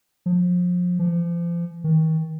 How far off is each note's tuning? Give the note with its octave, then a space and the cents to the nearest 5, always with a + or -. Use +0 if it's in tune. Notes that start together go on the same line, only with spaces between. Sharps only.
F3 +30
F3 -35
D#3 +35